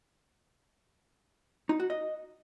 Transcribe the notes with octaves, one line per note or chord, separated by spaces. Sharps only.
D#4
F#4
D#5